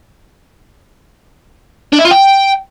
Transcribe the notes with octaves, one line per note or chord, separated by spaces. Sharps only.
D4
E4
F4
G5